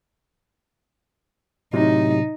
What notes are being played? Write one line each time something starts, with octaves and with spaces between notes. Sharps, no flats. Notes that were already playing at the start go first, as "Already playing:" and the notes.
A2 C3 F#3 D#4